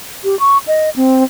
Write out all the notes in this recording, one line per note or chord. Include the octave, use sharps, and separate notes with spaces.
G4
C#6
D#5
C4